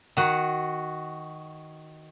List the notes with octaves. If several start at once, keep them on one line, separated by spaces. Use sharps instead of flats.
D#3 F#4